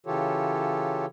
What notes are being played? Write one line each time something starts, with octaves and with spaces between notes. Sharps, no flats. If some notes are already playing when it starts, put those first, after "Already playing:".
C#3 E3 F4 G4 A4 C#5